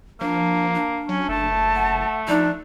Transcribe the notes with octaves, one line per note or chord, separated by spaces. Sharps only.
F3 A#3 D4
D4
F#3 C#4
F#1 A3 A5
F#5
F3 D4 D#4